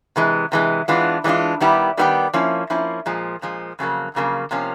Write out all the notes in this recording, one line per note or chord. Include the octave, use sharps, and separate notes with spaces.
C3 E3 G#3
C3 E3 G#3
E3 G#3 B3 D4 F4
E3 G#3 B3 D4 F4
D#3 G3 B3 E4 G4
D#3 G3 B3 E4 G4
F3 A#3 C#4 E4
F3 A#3 C#4 E4
A#2 F3 G#3
A#2 F3 G#3
F2 C#3 F#3 A#3
F2 C#3 F#3 A#3
C3 F3 A#3 C#4